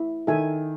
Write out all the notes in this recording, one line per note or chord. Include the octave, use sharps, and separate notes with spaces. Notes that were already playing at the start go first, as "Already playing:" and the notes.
Already playing: E4
D#3 A4 E5 G#5